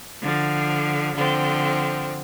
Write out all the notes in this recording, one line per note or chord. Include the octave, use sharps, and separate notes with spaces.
D3 F3
D3 F3 C4